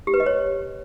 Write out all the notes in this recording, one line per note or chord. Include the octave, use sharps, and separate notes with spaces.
G4
B4
D#5
C#5